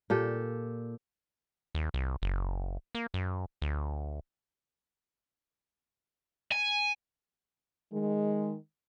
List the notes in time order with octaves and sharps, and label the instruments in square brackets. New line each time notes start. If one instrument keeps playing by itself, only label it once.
[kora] A#2 G4 A4
[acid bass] D#2
C2
F#1
A#3
F#2
D2
[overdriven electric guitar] G#5
[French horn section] D#3 G#3